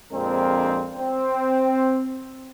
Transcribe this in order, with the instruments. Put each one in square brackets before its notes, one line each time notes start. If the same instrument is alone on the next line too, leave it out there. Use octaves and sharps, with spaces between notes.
[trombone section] A#1 F2 G#3 C4 D4 A#4
C4